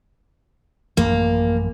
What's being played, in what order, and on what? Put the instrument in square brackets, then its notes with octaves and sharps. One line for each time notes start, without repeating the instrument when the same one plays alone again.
[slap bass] A1 F#2 F3 [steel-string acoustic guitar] A#3